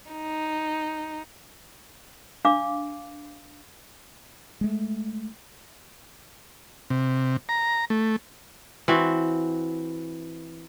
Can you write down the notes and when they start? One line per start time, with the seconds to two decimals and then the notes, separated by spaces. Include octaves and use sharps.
0.11 D#4
2.45 D4 F5 D6
4.61 G#3 A3
6.90 C3
7.49 A#5
7.90 A3
8.88 E3 C4 F#4